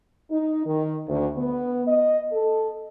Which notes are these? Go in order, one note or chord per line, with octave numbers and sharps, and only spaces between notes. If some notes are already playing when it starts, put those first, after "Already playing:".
D#4
D#3
D2
B3
D#5
A4